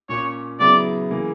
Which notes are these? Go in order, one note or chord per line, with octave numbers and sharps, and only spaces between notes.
A#2 A#3 C#4 C#5
C#3 F#3 B3 E4 D5
C#3 E3 A#3